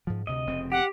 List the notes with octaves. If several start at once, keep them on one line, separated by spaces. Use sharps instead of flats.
G#2 F3
D2 C3 D#5
F1 C#3 C4
G4 F#5